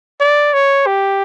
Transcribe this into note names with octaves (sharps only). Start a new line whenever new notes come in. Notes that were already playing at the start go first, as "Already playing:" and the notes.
D5
C#5
G4